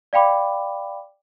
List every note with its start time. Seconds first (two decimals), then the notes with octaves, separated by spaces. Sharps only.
0.13 D5 F5 G5 B5 D6